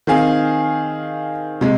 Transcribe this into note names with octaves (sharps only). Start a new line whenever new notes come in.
D#3 C4 G#4 F5
C3 G#3